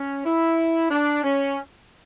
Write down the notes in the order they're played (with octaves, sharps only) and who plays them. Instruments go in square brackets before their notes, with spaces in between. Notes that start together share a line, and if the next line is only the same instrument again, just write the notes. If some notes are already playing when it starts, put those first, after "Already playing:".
Already playing: [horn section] C#4
E4
D4
C#4